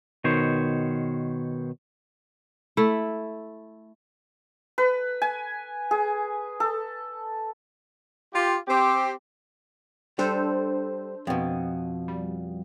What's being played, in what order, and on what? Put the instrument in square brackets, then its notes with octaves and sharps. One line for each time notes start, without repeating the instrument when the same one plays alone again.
[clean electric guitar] B2 D#3 C5 C#5
[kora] A3 E4
[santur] B4
G#5
G#4
A4
[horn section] F4 G4
C4 G4
[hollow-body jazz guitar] G3 [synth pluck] D4 A4 C5
[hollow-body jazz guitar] F2 B2
[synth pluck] G3